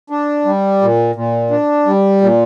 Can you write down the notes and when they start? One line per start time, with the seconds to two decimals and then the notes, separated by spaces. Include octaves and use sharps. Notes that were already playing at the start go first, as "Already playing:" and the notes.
0.10 D4
0.45 G3
0.81 A#2
1.15 A#2
1.50 D4
1.86 G3
2.21 A#2